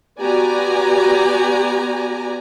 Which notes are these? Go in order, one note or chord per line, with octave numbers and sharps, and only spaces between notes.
B3 F#4 G4 D5 G#5 A#5